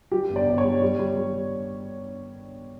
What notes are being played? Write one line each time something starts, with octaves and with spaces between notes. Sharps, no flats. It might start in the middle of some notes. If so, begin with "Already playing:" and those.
G3 G4
G1
D5
G1
C#5
G3
G3
G3
G3